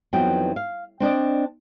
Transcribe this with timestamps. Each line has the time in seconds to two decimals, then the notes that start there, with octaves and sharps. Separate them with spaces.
0.13 F2 E3 F#3 B3 D#4 G5
0.56 F5
1.00 C4 D4 D5 D#5